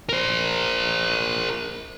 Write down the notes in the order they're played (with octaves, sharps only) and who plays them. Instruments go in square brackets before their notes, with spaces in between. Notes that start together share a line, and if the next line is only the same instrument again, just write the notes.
[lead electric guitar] A#4 C5